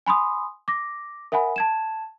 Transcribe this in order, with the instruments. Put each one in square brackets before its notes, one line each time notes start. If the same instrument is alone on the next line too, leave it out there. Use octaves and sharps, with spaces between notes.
[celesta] G#5 B5 C6 D#6
D6 A#6
A#4 E5 F#5 G#5 B5
A5 G#6 E7